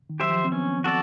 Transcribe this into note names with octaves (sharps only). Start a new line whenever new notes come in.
D#3
F#3 G4 C5 E5
F3
C4
B3 C#4
F#4 A4 D5